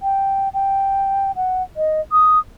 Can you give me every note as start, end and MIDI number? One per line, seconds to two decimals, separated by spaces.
0.01 0.49 79
0.54 1.32 79
1.36 1.63 78
1.77 2.01 75
2.12 2.39 87